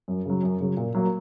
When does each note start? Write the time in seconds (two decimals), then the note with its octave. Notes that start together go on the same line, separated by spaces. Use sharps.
0.08 F#2
0.25 C#3 F#3
0.43 F#2
0.60 C#3 F#3
0.77 A#2
0.95 F#3 A#3